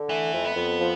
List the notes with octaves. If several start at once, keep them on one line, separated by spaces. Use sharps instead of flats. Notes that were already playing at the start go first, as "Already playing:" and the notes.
Already playing: D3
E3 A3
F2
B3
F2
F3